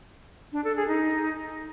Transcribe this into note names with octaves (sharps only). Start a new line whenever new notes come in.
D4
A4
G#4
D#4